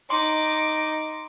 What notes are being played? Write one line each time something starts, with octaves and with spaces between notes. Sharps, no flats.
D#4 C6 D6